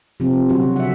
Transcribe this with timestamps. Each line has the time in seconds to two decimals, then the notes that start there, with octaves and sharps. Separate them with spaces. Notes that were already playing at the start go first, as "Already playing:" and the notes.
0.20 C3 F3 C4
0.49 B2 D3 F#3 F#4
0.62 C#3
0.76 E5 F#5